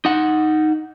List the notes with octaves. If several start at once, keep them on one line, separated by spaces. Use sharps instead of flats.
D#4 F#5